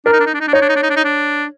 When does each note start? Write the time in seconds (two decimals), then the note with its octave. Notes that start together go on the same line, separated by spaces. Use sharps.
0.05 D4 A#4
0.13 D#4
0.20 D4
0.26 D#4
0.34 D4
0.40 D#4
0.47 D4
0.53 D#4 C#5
0.62 D4
0.69 D#4
0.76 D4
0.83 D#4
0.90 D4
0.96 D#4
1.04 D4